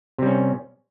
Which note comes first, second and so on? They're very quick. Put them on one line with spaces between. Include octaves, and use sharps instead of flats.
C3 G3 C#4